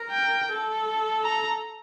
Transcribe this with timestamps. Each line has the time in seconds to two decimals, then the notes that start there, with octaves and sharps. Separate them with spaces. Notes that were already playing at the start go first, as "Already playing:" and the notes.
Already playing: A#4
0.11 G5
0.49 A4
1.24 A#5